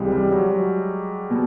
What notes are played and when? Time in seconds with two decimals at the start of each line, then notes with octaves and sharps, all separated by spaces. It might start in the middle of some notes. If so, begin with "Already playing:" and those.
Already playing: C#2 C3 E3 G3 G#3
0.12 G3
0.32 F#3
0.51 F#3
1.31 B2